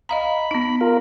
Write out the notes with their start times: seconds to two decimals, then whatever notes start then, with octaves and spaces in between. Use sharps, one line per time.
0.09 D#5 F5 A#5 B5
0.51 B3 D#4
0.81 F4 A#4